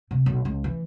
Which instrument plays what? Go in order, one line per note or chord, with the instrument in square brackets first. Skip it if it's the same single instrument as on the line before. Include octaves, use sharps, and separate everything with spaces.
[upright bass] C3
B1
C#2
E3